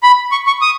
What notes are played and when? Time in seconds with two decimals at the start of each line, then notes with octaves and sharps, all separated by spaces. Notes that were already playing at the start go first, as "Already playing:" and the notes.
0.03 B5
0.32 C#6
0.47 C#6
0.62 D#6